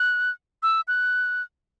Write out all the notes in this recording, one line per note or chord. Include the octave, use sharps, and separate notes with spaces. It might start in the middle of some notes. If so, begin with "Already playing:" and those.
Already playing: F#6
E6
F#6